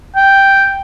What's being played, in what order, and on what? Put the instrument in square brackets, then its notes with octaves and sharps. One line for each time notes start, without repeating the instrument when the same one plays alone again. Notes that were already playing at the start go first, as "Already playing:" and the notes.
[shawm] G5